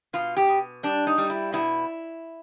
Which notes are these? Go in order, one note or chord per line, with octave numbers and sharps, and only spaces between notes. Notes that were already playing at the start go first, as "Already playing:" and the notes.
B2 F4
G4
B2
G3 D4
D#4
G3
E4
B2 E4